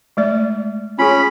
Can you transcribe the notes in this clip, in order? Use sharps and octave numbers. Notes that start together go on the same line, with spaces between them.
G#3 A3 D5
C#4 F4 G#4 B5